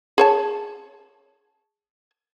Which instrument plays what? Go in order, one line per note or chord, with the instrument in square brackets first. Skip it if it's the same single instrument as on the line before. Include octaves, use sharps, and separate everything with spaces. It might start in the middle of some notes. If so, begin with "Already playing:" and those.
[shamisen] G#4 C#5 A5